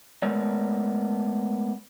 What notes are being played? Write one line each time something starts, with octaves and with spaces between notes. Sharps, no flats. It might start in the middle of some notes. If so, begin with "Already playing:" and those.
G#3 A3 B3 A#4 C#5 D5